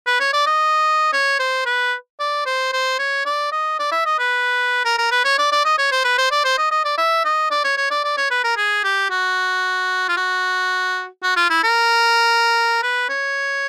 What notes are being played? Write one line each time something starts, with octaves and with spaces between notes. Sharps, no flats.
B4
C#5
D5
D#5
C#5
C5
B4
D5
C5
C5
C#5
D5
D#5
D5
E5
D#5
B4
A#4
A#4
B4
C#5
D5
D5
D#5
C#5
C5
B4
C5
D5
C5
D#5
D#5
D5
E5
D#5
D5
C#5
C#5
D5
D5
C#5
B4
A#4
G#4
G4
F#4
F4
F#4
F#4
F4
E4
A#4
B4
C#5